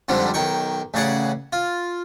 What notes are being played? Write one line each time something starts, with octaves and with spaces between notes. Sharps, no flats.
F2 G#2 D3 G3 C4
B1 D#3 G5 C#6
A1 C#3 G#4 D5 F#5
F4